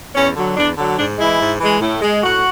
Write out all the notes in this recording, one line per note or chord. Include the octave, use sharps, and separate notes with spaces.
E2 C#4
D3 F#3
E2 D4
D3 F#3
G#2 D4
E3 G#3 E4
G#2
E3 G#3
A2
G#3
A2 F#4